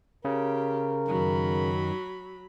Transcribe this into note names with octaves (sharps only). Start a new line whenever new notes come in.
C#3 G4 A#4
F#2 D#3 F#3 B5